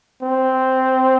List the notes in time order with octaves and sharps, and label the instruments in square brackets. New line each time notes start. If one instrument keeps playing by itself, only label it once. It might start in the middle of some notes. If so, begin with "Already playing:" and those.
[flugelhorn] C4